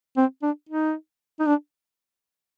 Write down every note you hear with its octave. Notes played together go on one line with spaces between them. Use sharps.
C4
D4
D#4
D#4
D4